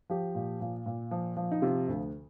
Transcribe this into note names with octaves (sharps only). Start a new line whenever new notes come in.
F3 G4
A#2
A#2
A#2
F3
F3
D#4
C3 F4
D2